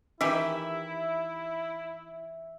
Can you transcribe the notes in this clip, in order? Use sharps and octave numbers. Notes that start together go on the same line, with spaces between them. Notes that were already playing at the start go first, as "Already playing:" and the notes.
D#3 E3 E4 G4 E5